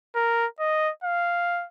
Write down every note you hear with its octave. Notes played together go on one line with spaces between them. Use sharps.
A#4
D#5
F5